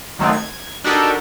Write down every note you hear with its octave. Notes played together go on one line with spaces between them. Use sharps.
D#3 F#3 A3 C4 D#4
G#6
D4 D#4 F#4 G4 A4 A#4